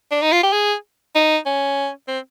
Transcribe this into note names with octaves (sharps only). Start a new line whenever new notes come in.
D4
D#4
F4
G4
G#4
D#4
C#4
C4